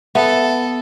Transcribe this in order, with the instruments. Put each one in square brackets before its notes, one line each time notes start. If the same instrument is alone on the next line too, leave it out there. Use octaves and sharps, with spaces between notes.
[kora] B3 [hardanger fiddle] A4 [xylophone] E5